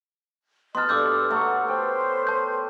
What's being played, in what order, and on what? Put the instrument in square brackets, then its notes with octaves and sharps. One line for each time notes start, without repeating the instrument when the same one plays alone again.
[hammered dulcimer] B3 A5 [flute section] D#5 [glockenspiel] C6 F6
[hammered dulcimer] G2 [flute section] A4 B4 D5 [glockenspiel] D6 E6 G6
[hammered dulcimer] A3 C#5 C#6 [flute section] F#5 A#5
[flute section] B4 C5 C6 [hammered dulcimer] G5
[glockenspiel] A5 G6